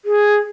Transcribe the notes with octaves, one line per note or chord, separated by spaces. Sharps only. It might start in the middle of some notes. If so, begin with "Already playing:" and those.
G#4